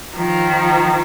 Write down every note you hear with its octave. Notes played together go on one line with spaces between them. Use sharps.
D#3 F3